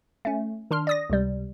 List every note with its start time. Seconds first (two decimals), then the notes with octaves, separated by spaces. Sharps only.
0.25 A3 C#4
0.71 D#3 D4 C6 F6
0.87 D5 D#6 A#6
1.10 C#2 C3 G3